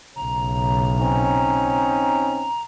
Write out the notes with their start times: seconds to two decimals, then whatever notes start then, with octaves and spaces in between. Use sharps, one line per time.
0.16 B1 C#3 A#5
0.99 C4 C#4 D#4